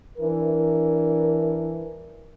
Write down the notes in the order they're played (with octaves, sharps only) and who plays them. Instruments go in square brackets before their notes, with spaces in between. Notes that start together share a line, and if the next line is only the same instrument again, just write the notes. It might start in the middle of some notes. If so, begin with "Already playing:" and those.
[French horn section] E3 D4 A#4